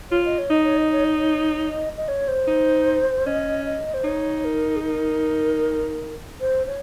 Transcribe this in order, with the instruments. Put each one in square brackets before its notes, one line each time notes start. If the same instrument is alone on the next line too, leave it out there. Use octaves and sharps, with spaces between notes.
[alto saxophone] F4 [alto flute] C#5
[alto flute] D#5
C#5
[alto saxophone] D#4 [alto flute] D#5
[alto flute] C#5
D#5
C#5
D#5
C#5
D#5
D#5
C#5
C5
[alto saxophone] D#4
[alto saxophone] C#4 [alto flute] D#5
[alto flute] D#5
C5
[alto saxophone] D#4 [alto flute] C#5
[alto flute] A#4
G#4
A#4
C5
C#5